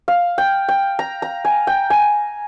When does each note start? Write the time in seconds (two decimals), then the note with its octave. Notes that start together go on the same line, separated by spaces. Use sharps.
0.08 F5
0.38 G5
0.69 G5
0.99 A#5
1.22 A#5
1.45 G#5
1.67 G5
1.90 G#5